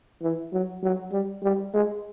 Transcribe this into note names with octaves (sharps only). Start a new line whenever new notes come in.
E3
F#3
F#3
G3
G3
G#3